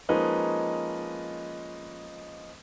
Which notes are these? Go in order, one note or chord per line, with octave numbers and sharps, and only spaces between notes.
F3 G#3 A#3 C#4 D#4 B4